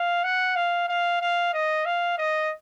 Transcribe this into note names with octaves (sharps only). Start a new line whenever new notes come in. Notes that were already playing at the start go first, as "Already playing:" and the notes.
Already playing: F5
F#5
F5
F5
F5
D#5
F5
D#5